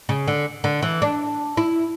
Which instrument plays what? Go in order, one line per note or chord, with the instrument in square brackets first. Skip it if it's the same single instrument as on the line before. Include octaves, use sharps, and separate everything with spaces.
[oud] C#3
D3
D3
E3
D4
E4